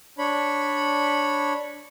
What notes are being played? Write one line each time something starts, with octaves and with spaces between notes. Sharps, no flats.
D4 C#5 B5